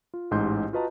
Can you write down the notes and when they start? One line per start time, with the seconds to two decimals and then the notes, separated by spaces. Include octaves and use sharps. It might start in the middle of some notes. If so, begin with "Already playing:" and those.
0.14 F4
0.31 A1 G#2 D#4 G4 C6 G6
0.73 F4 F#4 B4 D#5 A5 A#5